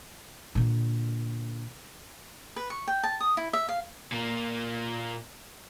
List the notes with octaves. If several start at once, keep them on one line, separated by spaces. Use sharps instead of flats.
A#2 D3
B4
C#6
G5
A5
D#6
E4
E5
F5
A#2 A#3